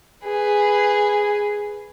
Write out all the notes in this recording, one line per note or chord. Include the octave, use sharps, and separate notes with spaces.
G#4 B4